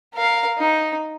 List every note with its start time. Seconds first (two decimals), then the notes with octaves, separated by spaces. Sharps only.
0.14 A#4 F5
0.58 D#4